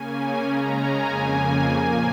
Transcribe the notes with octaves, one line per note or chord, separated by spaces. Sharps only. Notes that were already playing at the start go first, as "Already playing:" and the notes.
Already playing: C#3 A#3 C#4 G#5
G#5
C#3 G#3 C#4 A#5
G#5
F2 C#3 A#3 G#5
A#2 F3 A#3 G#5